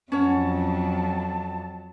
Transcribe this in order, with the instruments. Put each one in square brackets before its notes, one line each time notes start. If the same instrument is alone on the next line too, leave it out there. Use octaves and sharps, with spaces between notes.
[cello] F2 F#3 [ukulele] C#4 C#5 F#5 [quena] A5